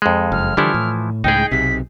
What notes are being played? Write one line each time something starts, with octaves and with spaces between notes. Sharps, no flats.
F2 G#3
F#1 F6
D3 E3 F3 G3 E4
A2
C#2 A2 G#3 D#4 G#4 G5
B1 C3 B6